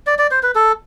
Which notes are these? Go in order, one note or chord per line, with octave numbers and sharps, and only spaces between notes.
D5
D5
C5
B4
A4